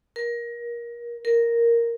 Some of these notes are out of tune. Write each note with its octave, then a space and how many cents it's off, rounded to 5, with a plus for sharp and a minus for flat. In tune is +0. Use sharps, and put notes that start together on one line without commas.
A#4 +25
A#4 +0